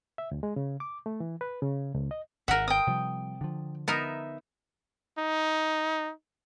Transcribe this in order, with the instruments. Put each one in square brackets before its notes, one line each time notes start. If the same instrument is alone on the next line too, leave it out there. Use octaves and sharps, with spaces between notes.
[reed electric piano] E5
D2
G#3
C#3
D6
A3
E3
B4
C#3
C#2
D#5
[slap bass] G#1 [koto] A#4 E5 [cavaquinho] F#5
[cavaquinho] G5 D#6
[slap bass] C3 F3 G3
D3 F3
[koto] B3 D#4 A#4 [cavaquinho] E5
[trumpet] D#4